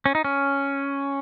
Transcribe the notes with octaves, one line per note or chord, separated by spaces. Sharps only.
C#4
D#4
C#4